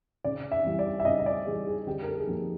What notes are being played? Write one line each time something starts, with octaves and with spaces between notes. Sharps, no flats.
C#3 D5
E5
E3 G3
D5
E5
C#3 D#5
D#5
D5
E3 G3 G#4
G#4
D3 G4
A#4
A4
G#4
F3 A#3 D#4 G4